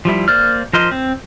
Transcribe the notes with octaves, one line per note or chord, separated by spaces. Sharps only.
F3 G3 E4
A#3 C5 D5 F6
F3 A#4 C5 D#5
C4